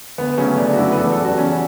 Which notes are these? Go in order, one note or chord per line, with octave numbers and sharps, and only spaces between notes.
D2 B3
C#3 F#3 A3 C#4
D2 D4
F#4
C#3 F#3 A3 E4
B4
E2 A4
A4
C#3 G3
F#4
E2 C#4